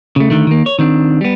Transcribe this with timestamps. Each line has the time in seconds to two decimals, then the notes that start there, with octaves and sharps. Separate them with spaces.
0.16 C#3 A3
0.30 D3 D#3 A3
0.47 D#3 A#3
0.66 C#5
0.79 D#3 C4 D4
1.21 G3 B3